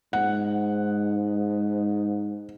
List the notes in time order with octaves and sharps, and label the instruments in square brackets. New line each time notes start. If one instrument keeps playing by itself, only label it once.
[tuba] G#2 [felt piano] F#5